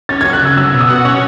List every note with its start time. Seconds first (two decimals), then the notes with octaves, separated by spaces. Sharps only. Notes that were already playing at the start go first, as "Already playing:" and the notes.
0.09 C#4 A6
0.21 F#3 G#6
0.33 F#6
0.41 C#3 E6
0.57 F#3 E6
0.73 B2
0.81 D#6
0.89 F#4
1.05 C#4 C#6